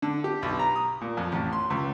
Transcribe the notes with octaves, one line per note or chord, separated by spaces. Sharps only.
D3
G4
B1
A#5
D#6
A#2
F2
A1
C6
C#2